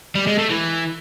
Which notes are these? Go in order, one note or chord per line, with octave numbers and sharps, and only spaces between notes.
G3
G#3
A3
E3